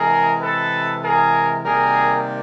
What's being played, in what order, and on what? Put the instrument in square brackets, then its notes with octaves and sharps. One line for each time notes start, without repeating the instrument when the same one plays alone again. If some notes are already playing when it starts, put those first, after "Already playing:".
Already playing: [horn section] C3 E3 G#3 G#4 A#4
A4 B4
G#4 A#4
C3 D#3 G3 A#3 G#4 A#4